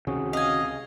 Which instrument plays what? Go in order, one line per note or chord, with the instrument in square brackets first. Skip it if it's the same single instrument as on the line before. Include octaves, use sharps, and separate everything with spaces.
[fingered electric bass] C#2 C3 D#3 [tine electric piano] C#4 F#4 G#4
[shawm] D#5 [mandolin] F5 G#5